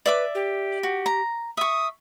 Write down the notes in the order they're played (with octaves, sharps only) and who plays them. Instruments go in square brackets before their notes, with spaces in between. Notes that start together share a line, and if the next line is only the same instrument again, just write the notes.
[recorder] B4 [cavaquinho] D5 E5 D6
[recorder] G4
[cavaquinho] F#4
A#5
[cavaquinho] E5 C#6 [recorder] D#6